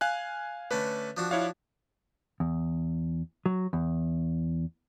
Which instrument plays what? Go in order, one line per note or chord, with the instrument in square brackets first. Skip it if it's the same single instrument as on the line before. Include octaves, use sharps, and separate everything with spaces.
[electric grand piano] F5 G#5 F#6
[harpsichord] D3 A3 C#4 [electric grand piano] B4
[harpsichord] F3 D4 F#4
[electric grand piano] E4 C#5 F5
[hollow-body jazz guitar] E2
F#3
E2